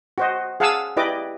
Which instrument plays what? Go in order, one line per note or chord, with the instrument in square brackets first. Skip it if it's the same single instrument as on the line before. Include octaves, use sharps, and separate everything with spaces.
[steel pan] F#4 C5 D#5
G#4 F5 F#5 G#5 A5 E6
E4 G4 B4 D5 D#5 D6